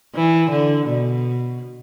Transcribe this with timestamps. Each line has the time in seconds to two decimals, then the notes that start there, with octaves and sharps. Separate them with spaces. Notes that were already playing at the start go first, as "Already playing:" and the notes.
0.15 E3
0.50 D3
0.86 B2